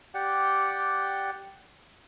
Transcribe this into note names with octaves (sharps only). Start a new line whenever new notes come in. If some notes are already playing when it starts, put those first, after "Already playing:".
G4 D5 F#5 G5